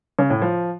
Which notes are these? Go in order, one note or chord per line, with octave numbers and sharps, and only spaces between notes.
C#3
A2
F3